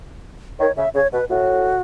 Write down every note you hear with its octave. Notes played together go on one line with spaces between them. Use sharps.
D#3 C#5
C#3 E5
C#3 C#5
B2 B4
A2 F#4